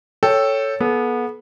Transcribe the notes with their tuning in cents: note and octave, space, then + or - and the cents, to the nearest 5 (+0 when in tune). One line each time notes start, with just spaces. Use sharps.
A4 +0 C#5 +0 G5 +0
B3 -25 A4 -45